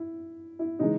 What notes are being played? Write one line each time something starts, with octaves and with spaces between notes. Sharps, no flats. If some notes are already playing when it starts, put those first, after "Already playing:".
Already playing: E4
E4
C#3 E3 G#3 D#4